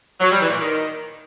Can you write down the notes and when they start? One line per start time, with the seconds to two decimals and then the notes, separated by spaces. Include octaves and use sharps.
0.20 F#3
0.30 G3
0.40 E3
0.50 A#2
0.60 D#3